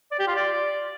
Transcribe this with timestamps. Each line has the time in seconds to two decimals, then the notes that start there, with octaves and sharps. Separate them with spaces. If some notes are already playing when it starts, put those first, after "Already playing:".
0.12 D5
0.20 G4
0.28 F4
0.36 D5